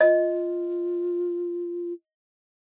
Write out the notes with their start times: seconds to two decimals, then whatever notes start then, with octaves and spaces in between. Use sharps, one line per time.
0.01 F4 D#5